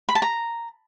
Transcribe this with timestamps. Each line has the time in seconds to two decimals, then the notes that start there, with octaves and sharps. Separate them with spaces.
0.09 B5
0.15 A5
0.22 A#5